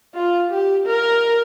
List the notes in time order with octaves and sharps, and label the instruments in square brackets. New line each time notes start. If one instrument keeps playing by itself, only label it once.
[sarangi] F4
G4
A#4